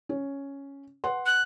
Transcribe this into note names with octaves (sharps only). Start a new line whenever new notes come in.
C#4
B4 F#5 C6
F#6